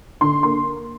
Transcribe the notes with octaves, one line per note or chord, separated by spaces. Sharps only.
D3 C6
A#3 C6